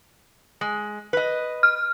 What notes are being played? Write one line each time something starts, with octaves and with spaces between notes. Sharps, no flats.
G#3
B4 D#5
F6